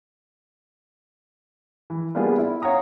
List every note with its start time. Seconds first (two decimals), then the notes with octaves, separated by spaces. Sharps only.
1.90 E3
2.15 G3 A#3 B3 D4 F4 G#4
2.38 E4
2.62 C#4 C#5 F5 F#5 A#5 D#6